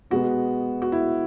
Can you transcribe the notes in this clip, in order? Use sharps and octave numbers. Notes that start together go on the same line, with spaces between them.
B2 G#3 B3 F#4
F#4
E4